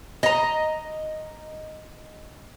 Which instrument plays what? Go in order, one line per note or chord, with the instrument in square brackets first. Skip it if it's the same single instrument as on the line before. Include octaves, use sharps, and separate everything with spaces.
[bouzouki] D#5 A#5